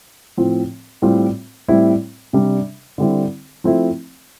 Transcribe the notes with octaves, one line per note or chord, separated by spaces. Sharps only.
A2 F3 C4
A2 G3 C4 F4
A2 G3 C4 E4
C3 G3 D4
D3 G3 C4 E4
F3 A3 C4 E4